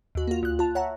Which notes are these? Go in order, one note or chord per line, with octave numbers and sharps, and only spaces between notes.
D#2 F#4
A#3 F4
D2 F#6
F4 A5
C#5 E5 F#5 A#5